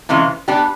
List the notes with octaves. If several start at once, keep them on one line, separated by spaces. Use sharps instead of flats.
C3 E3 G#3 C#4 F4
G3 B3 D4 G4